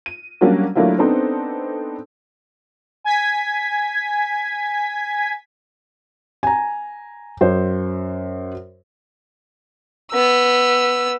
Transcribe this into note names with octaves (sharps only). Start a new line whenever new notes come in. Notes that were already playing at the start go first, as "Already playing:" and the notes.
D#7
F#3 G3 A#3 C#4 D4 F#4
F#3 A3 A#3 D4 E4 F4
B3 C4 D4 D#4 A4 C5
G#5 G#6 B6
G#5 A#5
F#2 C5
B3 E6